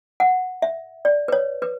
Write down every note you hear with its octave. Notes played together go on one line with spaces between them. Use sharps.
F#5
E5
D5
B4
C#5
B4